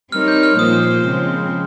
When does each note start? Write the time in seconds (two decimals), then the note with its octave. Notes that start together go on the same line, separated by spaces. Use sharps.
0.12 G3 C4 D#4 A#4 C#5 F6
0.28 G6
0.43 F6
0.59 A#2 F3 A#3 F4 C5 D#6
1.06 C#3 F3 G#3 C4